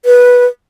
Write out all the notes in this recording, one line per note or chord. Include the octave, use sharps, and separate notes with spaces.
B4